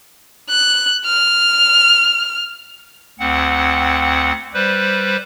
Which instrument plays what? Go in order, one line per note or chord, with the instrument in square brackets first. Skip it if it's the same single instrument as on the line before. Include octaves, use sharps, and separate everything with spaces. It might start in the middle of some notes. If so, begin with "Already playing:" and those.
[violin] F#6
F6
[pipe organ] D2 C4 F#5
G3 B4 C5